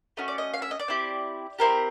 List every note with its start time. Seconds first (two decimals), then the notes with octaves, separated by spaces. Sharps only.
0.17 A3 C#4 F#4 D#5
0.28 D5
0.38 D#5
0.54 F5
0.62 E5
0.71 D#5
0.79 D5
0.88 C4 E4 G4
1.59 C4 E4 G4 A#4